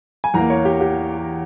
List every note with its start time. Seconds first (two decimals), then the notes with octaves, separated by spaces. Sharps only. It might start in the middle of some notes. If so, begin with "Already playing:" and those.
0.24 G#5
0.34 E2 E3 A#3 A#5
0.50 C#5
0.65 G4
0.81 G4